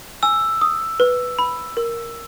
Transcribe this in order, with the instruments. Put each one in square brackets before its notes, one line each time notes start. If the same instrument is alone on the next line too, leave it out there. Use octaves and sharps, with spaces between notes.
[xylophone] G#5 [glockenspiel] E6
[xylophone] D#6
B4
B5
A#4